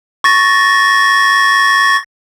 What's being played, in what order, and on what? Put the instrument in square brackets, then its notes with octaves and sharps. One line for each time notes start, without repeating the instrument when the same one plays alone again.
[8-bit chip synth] C#6 A6 A#6